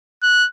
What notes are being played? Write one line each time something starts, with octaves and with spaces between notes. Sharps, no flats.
F#6